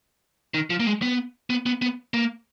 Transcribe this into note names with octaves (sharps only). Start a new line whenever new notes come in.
D#3
F3
A#3
G#3
B3
B3
B3
B3
A#3